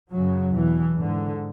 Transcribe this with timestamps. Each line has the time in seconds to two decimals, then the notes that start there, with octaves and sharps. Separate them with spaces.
0.11 F#2 C#3 F#3
0.54 E2 B2 E3
0.98 G#2 D3